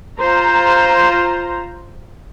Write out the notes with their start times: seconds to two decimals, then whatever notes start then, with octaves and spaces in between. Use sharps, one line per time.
0.21 F4 C5 A#5